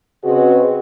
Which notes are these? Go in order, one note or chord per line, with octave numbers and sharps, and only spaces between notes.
C#3 C4 F#4 G#4 B4 D#5